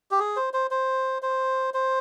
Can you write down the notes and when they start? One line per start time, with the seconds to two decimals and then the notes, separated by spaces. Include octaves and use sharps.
0.11 G4
0.19 G#4
0.36 C5
0.54 C5
0.71 C5
1.22 C5
1.74 C5